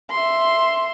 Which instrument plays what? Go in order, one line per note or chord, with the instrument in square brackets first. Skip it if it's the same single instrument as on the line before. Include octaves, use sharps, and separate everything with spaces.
[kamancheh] E5 C6